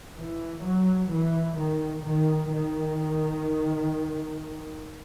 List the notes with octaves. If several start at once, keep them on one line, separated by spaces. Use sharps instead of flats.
E3
F#3
E3
D#3
D#3
D#3